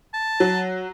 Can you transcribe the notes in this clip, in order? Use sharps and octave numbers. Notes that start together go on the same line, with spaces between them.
A5
F#3